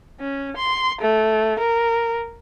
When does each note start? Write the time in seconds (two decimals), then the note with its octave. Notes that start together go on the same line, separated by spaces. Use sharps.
0.20 C#4
0.56 C6
1.01 A3
1.59 A#4